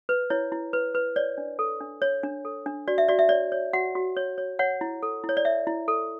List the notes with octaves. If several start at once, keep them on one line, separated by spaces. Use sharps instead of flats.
B4
E4 C#5
E4
B4
B4
C#5 D5
D4
A4
D4
C#5
D4
A4
D4
F#4 D5
E5
F#4 D5
E5
C#5 D5
C#5
F#4 F#5
F#4
C#5
C#5
C#5 F#5
E4
A4
E4
C#5
D5
C#5 E5
E4
A4